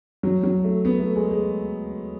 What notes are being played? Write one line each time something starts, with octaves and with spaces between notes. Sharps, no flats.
F#3
F#3
A3
B3
A3
G#3
G#3